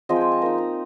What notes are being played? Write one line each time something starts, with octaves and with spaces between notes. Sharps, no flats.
F3 G#3 C4 D#5
G5 G#5
A5
A#3 D#4 A#5
A#5